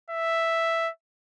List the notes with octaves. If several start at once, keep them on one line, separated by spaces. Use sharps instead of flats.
E5